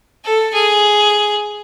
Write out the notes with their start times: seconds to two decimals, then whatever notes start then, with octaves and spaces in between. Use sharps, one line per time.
0.25 A4
0.54 G#4